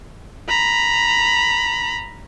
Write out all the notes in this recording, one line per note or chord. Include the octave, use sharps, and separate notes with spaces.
A#5 B5